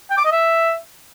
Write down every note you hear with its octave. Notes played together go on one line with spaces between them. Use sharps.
G5
D6
D#5
E5